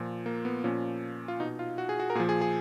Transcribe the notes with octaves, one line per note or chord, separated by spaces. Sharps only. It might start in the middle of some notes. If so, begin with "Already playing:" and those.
Already playing: A#2 F3
A#3
B3
A#2 F3 C#4
F4
B2 D#4
F4
F#4
G#4
F#4
A#4
A#2 F3 G#4
G#4
G#4